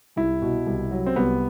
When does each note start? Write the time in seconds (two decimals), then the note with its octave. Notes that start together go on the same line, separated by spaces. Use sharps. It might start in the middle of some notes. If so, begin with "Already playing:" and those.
0.16 C2 E4
0.42 B2
0.66 C2
0.91 F#3
1.06 C4
1.16 C2 B3